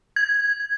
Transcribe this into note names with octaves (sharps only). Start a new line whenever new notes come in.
G#6